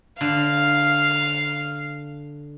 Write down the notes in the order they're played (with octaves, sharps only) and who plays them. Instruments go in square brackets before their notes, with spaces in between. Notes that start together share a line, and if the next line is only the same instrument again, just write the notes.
[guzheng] D3 [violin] F5